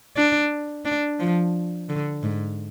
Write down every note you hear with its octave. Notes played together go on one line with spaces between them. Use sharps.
D4
D4
F3
D3
G#2